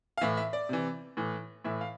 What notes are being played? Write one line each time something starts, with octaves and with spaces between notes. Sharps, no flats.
F5
A2 E3 E5
E5
D5
C3 E3
A2 E3
A2 E3 E5
F5